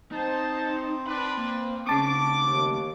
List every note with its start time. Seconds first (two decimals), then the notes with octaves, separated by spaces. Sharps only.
0.12 C4 D#4 C5 A5
1.07 D4 B4 B5
1.37 A#3
1.87 C#3 A3 C4 A5 C#6 D6
2.37 D#2